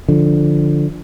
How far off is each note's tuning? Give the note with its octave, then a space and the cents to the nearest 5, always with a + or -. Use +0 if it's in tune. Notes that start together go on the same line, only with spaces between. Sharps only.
D3 +0 F3 +0